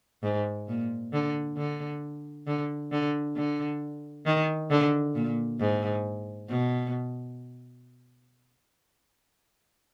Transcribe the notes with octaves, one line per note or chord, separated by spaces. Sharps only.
G#2
A#2
D3
D3
D3
D3
D3
D#3
D3
A#2
G#2
B2